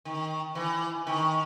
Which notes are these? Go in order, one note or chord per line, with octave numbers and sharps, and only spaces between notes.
D#3
E3
D#3